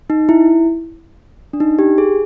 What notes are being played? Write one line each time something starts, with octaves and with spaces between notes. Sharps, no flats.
D#4
E4
D4
D#4
G4
G#4